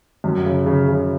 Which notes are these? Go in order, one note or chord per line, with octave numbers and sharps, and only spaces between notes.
F#2
C#3
C#3
C#3